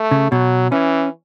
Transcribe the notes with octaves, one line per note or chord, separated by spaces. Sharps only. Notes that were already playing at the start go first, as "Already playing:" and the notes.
Already playing: A3
C#3
B2 F#3
E3 C#4